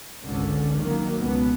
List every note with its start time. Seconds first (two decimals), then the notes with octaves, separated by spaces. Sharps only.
0.22 G#1 C#2 D3 C#4
0.76 D#3 F#3 A#3
1.18 C#2 B2 B3